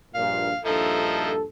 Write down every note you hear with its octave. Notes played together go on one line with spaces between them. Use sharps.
A#1 G2 A#2 F5
A#1 G2 F3 D#4 E4 A4